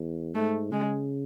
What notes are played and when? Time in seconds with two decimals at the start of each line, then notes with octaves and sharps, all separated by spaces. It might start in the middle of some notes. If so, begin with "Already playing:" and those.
Already playing: E2
0.35 G#2 A3
0.71 C#3 G#3